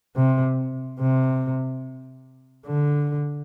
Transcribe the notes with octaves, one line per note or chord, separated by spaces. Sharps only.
C3
C3
D3